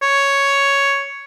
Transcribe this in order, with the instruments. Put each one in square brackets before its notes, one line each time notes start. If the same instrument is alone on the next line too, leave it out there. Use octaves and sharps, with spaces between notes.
[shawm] C#5